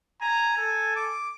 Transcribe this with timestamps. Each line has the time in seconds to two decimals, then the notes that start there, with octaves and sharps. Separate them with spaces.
0.21 G#5 A#5
0.58 A4
0.96 D6